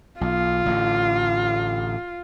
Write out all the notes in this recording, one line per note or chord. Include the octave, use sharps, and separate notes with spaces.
B1 F4
A1 A2 D3